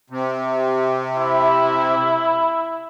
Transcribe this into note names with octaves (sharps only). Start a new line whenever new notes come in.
C3
E4